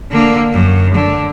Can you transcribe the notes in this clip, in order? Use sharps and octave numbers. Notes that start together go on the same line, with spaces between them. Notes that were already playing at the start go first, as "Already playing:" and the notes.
D3 A#3
F#2
D3